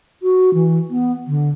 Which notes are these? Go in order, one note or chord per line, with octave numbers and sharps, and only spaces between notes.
F#4
E3
B3
D3